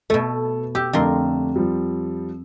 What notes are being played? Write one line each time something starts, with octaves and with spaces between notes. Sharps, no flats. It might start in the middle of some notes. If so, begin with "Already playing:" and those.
B2 A3 A4
G4 E6
F2 D3 A3 D4 A#4 C6
F3 G3